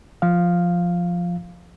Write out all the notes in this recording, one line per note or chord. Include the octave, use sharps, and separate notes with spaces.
F3 F5